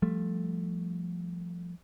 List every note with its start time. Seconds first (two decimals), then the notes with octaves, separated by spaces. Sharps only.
0.02 F3 G3 A3